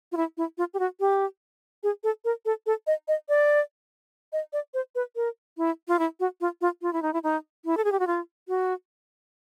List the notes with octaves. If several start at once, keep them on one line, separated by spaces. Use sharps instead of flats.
F4
E4
E4
F4
G4
F#4
G4
G#4
A4
A#4
A4
A4
D#5
D#5
D5
D#5
D5
C5
B4
A#4
E4
F4
E4
F#4
F4
F4
F4
E4
D#4
E4
D#4
E4
A4
G#4
G4
F#4
F4
F#4